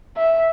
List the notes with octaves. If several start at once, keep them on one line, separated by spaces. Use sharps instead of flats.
E5